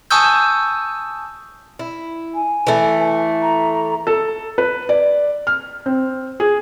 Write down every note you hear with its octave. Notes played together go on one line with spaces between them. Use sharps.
G#5 A5 C#6 D#6 E6 G6
E4
G#5
E3 A3
A#5
A4
B4
D5
F6
C4
G#4